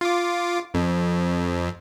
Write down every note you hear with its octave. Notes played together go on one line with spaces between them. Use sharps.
F4 D6
F2